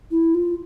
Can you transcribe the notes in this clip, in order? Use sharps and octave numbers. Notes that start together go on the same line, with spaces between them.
E4
F4